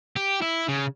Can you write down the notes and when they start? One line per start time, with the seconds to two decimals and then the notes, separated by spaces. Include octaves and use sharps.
0.16 G4
0.41 E4
0.68 C#3